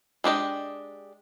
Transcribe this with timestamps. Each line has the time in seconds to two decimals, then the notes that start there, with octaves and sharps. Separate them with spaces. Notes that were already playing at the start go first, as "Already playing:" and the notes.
0.24 G#3 D4 G4 D#5